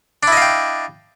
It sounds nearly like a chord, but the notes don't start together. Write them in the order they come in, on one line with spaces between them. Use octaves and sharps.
D4 E4 D#5 F5 G5